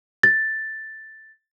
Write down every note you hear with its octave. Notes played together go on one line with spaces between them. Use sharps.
A6